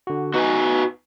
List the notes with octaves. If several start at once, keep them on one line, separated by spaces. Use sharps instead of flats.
D3 F#4
B3 D#4 F#4 B4 G#5